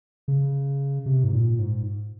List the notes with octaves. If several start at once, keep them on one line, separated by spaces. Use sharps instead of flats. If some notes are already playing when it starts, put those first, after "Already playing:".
C#3
C3
G#2
A#2
G#2